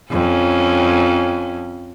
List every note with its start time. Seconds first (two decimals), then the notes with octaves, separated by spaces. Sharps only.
0.11 F2 C#4